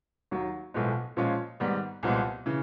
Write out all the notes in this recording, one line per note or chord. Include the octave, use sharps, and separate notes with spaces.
D#2 D#3 F#3
B1 A2 F3 G#3 B3
A#2 F3 G#3 C#4 F4
G#2 D#3 G3 B3
C2 A#2 F3 G#3 B3
C#3 E3